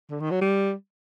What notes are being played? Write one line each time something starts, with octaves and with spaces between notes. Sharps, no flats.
D3
D#3
F#3
G3